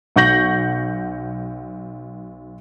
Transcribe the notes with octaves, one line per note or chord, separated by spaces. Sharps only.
B1 F#5 C#6 G6 A#6 F#7